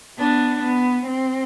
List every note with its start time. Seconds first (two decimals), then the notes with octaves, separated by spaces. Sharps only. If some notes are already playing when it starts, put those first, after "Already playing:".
0.18 B3 D4
0.62 B3
1.06 C4